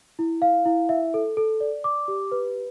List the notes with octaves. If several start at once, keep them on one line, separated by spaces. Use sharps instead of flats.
E4
F5
E4
E5
A4
A4
D5
D6
G4
B4